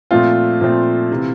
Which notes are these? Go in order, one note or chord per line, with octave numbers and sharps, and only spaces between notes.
A#2 F3 A3 C4 F4
A#2 F3 A3 C4
C3 E3